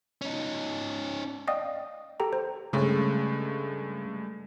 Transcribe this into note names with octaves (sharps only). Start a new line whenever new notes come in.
C#4 D#4
D5 D#5 F5 G5 D#6
G4 A4 G5 A#5
C5
G2 C#3 G#3 A3